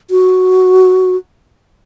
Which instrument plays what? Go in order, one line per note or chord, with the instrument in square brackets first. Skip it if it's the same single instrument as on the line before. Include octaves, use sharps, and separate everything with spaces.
[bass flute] F#4